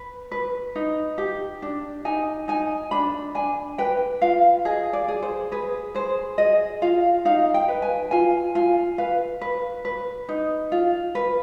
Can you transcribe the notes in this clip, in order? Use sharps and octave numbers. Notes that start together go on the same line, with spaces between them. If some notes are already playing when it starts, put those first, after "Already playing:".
Already playing: B4
B4
D#4
G4
D4
D#4 G#5
D#4 G#5
D4 B5
D4 G#5
B4 G5
F4 F5
G#4 D#5
D5
G#4
C5
G#4 B4
G#4 C5
G#4 D#5
F4 F5
D#4 F5
G5
B4
G#5
F4 G#5
F4 G#5
B4 F5
B4
B4
D#4
F4
B4